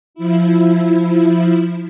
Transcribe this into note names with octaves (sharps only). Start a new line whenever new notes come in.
F3 E4